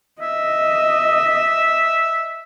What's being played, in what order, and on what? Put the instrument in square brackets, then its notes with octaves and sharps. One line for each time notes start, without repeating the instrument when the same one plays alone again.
[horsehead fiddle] D#5 [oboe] E5